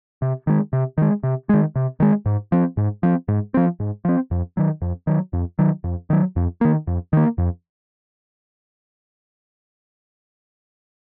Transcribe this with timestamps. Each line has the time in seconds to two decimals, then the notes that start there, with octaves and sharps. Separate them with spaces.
0.22 C3
0.47 D#3 G#3
0.73 C3
0.98 D#3 G#3
1.23 C3
1.49 D#3 G#3
1.76 C3
2.00 D#3 G#3
2.26 G#2
2.52 F3 C4
2.77 G#2
3.03 F3 C4
3.28 G#2
3.54 F3 C4
3.80 G#2
4.05 F3 C4
4.31 F2
4.57 D#3 F#3
4.82 F2
5.07 D#3 F#3
5.33 F2
5.59 D#3 F#3
5.84 F2
6.10 D#3 F#3
6.36 F2
6.61 D#3 A#3
6.87 F2
7.13 D#3 A#3
7.38 F2